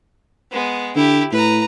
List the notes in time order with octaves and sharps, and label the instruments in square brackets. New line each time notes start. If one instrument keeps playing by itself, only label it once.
[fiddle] G#3 B3
[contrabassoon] D3 [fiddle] E4 G4
[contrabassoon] A2 [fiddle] B4 A#5